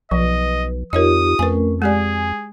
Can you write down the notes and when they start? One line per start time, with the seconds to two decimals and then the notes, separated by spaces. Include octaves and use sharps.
0.11 B1 F3 B4 D#5
0.93 F2 D#4 F4 G4 A#4 C#5 D#5 D#6
1.39 F2 A3 C#4 A#4 B4 G#5
1.82 G#3 G4 G#4 D5 G#5